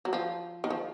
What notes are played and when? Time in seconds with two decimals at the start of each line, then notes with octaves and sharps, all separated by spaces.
0.05 F#3
0.13 F3
0.64 D#3
0.70 F3